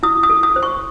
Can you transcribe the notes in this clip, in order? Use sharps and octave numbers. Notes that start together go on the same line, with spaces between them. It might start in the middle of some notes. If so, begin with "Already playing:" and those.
E4 D#6
D#6
A4
D#6
C5
C#6